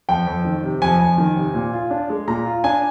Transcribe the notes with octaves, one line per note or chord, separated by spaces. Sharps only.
F2 G5
F2
D#3
C3
F2 G#5
F2
D#3
C3
A#2
F4
D4
G#3
A#2 A#5
F4
D4 G#5